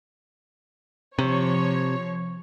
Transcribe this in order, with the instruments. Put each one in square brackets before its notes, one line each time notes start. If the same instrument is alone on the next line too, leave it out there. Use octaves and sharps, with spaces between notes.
[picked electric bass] C3 [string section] F3 C#5